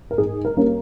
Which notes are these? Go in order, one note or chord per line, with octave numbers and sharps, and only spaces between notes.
A#4
G#2 G#4
A#4
G3 A#3 C#4